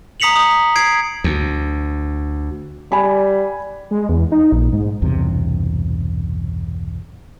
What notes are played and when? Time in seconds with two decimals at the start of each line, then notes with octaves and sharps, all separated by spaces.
0.20 A#5 D#6 B6 C#7 F7 F#7
0.36 D#6
0.76 G#6 C7 D7
1.24 D2
2.92 G3 G#5 B5
3.91 G#3
4.09 E2
4.32 D#4
4.52 A#1
4.73 G#2
5.02 B1 E2 G2 C3